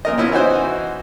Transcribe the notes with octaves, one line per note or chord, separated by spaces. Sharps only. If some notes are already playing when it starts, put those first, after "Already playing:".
A#2 A#4 D#5
B3 C#4 E4 F4
E3 D#4 F#4 C5